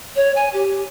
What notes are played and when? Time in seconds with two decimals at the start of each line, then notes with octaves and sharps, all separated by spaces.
0.16 C#5
0.36 G#5
0.53 G4